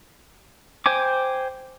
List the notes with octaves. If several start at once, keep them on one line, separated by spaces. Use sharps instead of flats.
C5 G5 G#5 D6